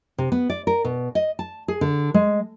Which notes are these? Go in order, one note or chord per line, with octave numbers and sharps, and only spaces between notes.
C3
B3
D5
A#4
B2
D#5
A5
G#4
D3
G#3